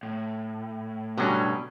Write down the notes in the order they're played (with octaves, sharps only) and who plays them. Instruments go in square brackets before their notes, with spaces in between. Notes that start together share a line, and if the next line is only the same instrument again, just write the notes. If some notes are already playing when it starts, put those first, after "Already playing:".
[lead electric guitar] A2
[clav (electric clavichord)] G2 D3 F#3 [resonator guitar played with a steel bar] B2 G3 C#4